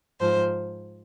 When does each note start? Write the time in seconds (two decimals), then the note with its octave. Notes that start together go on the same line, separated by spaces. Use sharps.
0.20 G#2 F3 C5